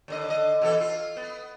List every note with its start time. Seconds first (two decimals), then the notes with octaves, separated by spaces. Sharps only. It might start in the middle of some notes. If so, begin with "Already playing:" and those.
0.08 D#2 D3 D#5
0.28 D3 D#5
0.62 B2 E3 A4
0.81 F4
1.17 B3